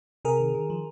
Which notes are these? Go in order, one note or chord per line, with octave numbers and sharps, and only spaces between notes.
C3 G#4 A#4
D#3
D#3
F3